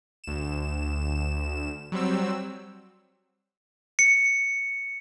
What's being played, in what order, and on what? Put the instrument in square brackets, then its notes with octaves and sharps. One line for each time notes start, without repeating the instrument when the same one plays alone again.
[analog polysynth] D2 E7
F#3 G3 C4 E6
[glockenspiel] C#7